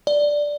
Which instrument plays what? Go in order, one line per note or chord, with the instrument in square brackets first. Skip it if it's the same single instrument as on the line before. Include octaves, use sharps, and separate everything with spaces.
[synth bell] D5